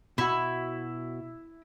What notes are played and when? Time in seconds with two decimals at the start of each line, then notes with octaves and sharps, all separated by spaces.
0.18 B2 E4 F#4